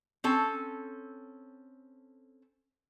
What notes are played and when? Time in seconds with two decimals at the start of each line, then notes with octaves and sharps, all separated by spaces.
0.24 C4 C#4 A4